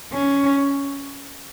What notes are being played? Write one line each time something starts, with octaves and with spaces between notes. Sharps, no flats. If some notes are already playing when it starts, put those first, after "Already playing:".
C#4